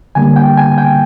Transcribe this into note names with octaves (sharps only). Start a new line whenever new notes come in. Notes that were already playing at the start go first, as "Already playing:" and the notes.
D3 G3 A#3 G#5
G5
G#5
G5